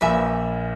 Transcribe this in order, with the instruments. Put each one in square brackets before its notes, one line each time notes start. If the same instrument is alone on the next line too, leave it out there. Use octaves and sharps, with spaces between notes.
[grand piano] A#1 A#2 [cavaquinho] B4 E5 G#5